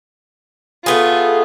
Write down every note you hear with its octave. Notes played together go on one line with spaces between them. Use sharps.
A3 B3 F4 G#4